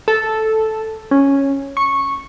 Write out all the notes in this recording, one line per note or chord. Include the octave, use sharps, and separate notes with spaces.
A4
C#4
C#6